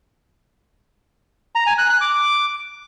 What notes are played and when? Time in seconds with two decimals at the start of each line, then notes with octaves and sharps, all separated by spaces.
1.55 A#5
1.67 G#5
1.78 F#6
1.90 F#6
2.01 D6